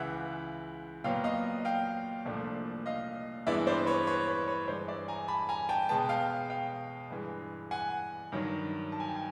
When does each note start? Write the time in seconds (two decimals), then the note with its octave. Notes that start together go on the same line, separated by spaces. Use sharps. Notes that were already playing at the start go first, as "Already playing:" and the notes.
Already playing: C#2 C#3 E3 E5 F#5
1.04 A#2 F#3 B3 F5 G5
1.24 D#5 F5
1.65 F5 G5
2.25 C2 A#2 F3 A3 D4
2.86 D#5 F5
3.47 G2 E3 G#3 B3 E4 D5 E5
3.67 C5 D5
3.86 B4 C#5
4.07 B4 C#5
4.28 B4 C#5
4.48 B4 C#5
4.68 G2 E3 G#3 C5 D5
4.88 D5 E5
5.08 G#5 A#5
5.28 A5 B5
5.49 G#5 A#5
5.69 G5 A5
5.89 B2 G#3 B3 G5 A5
6.09 F5 G5
6.50 F5 G5
7.10 G2 E3 G#3
7.71 F#5 G#5
8.32 G2 D#3 F#3
8.92 A5
9.00 G#5
9.08 G5
9.16 G#5